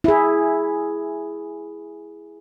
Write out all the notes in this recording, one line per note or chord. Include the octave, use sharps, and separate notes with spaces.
E4 G#4